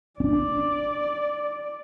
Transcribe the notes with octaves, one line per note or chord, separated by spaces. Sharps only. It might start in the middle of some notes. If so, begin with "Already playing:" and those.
C#4 D4 D5